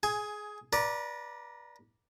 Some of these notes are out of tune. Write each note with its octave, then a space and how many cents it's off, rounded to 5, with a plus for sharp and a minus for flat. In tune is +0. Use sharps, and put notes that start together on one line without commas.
G#4 +15 G#5 +0
B4 -30 D5 +0 A#5 +0